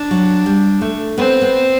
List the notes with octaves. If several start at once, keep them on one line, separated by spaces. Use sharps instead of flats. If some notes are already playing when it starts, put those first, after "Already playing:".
Already playing: D4
F#3
G3
A3
B3 C4
B3